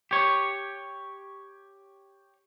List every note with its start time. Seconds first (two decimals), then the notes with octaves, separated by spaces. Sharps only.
0.11 G4 C#5